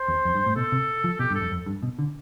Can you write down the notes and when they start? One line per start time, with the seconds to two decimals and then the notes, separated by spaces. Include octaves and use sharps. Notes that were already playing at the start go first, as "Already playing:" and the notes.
Already playing: C5
0.08 E2
0.25 F2
0.35 G2
0.46 A2
0.56 B2 A4
0.72 C3
1.04 F3
1.19 B2 G4
1.30 G2
1.35 A4
1.41 F2
1.52 F2
1.66 G2
1.83 B2
1.99 D3